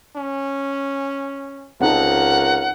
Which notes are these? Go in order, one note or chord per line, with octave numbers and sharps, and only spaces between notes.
C#4
C#2 C4 D#4 A4 A#4 F#5